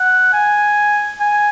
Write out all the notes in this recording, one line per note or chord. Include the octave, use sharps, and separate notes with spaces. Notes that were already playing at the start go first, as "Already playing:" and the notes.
Already playing: F#5
G#5
G#5